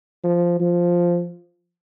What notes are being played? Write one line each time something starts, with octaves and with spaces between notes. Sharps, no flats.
F3
F3